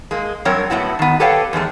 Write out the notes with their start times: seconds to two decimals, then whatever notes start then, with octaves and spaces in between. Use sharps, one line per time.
0.11 G#3 A#3
0.45 G2 F#3 C4 A#4 C#5
0.70 A2 G3 B3 E4 F#4
0.99 D#3 B3
1.20 G4 A4 B4 C#5 F5 G5
1.53 E2 G#2 G#3 A3